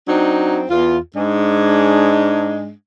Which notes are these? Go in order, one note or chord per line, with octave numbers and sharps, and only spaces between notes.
F#3 C4 D4 D#4
E2 F4
G#2 G#3 D4